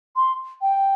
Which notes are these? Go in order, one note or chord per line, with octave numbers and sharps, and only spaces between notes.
C6
G5